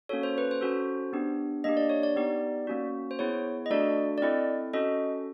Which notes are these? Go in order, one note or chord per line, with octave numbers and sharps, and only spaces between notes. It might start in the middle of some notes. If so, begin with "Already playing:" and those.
A#3 C#4 F#4 A4 C#5
C5
B4
C5
C#4 F#4 A4
B3 D4 G4
A#3 D4 G4 D#5
D5
C#5
D5
B3 D#4 G4
A#3 C#4 F#4
C5
B3 E4 G#4 C#5
D#5
A3 D4 F#4 A4 D5
D5
C4 E4 A4 D#5
C#4 F#4 A4 D#5